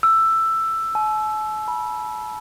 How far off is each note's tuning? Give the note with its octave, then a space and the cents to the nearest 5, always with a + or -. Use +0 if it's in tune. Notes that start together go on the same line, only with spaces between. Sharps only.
E6 +10
A5 -45
B5 -30